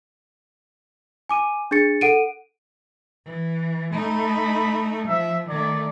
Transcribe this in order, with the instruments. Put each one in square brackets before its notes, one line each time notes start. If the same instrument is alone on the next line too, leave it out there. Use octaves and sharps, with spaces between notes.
[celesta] G#5 D6 D#7
D4 G#4 A6 C#7
A4 F#5 D7 D#7
[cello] E3
[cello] A3 D#4 [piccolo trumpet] B5
[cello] F3 [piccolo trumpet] E5
[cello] D#3 A3 [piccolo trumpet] D5